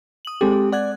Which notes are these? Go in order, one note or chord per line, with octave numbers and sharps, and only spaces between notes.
D#6 F#7
G#3 C4 G4 A4
D5 F#5 F#6 G#6